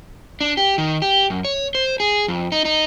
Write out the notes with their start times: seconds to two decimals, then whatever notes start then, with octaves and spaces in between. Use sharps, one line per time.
0.41 D4
0.57 G4
0.78 D#3
1.02 G4
1.30 F#2
1.45 C#5
1.75 C5
2.00 G#4
2.28 F2
2.52 D#4
2.65 D#4